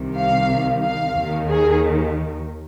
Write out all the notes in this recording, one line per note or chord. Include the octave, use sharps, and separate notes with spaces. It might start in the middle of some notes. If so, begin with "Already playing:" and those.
Already playing: C2 C3 D#3
F5
F5
D#2 D#3
G#4